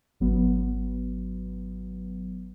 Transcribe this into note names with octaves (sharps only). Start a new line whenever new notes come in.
G#1 F#3 B3